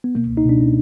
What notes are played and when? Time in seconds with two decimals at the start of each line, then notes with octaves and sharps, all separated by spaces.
0.04 B3
0.15 B2 A#3
0.30 C#2
0.37 D#4
0.45 B2 D4
0.61 C#4